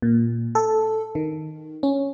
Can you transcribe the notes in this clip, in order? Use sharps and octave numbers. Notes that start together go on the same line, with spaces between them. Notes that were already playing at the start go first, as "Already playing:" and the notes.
A#2
A4
D#3
C#4